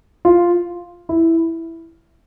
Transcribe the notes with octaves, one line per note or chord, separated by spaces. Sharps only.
F4
E4